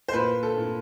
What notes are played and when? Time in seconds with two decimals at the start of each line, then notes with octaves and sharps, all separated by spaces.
0.08 C5
0.13 A#2 B4
0.43 A4
0.58 A#2